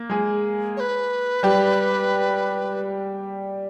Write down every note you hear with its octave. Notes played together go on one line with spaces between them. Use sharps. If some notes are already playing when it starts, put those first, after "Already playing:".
Already playing: A#3
G#3 G#4
C#5
B4
G3 G4